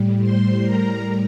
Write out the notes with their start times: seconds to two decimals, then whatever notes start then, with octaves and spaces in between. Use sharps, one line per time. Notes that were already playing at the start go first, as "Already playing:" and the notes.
Already playing: A2 G3
0.20 C5 C6
0.63 A#4 A#5